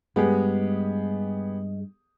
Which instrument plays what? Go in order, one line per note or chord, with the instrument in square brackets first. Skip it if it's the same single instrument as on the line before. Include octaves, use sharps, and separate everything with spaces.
[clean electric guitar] G2 [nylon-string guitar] G#3 [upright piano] B3 G4 G#4